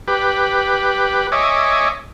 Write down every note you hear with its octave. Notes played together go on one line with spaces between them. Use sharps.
G4 B4
C#5 D#5 E5 G#5 D6